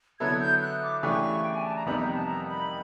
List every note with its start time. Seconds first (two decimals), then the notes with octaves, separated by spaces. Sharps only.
0.20 D3 F#3 B3 E4 A4 G#6
0.40 G6
0.62 F#6
0.83 D6
1.02 C#3 E3 A3 D4 G4 C#6
1.43 G5
1.54 G#5
1.65 A5
1.76 A#5
1.86 F2 C3 D#3 G3 B3 B5
2.00 A#5
2.14 A5
2.27 A#5
2.48 B5